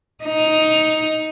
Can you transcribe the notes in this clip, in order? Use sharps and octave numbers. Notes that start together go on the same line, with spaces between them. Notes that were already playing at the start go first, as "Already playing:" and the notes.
D#4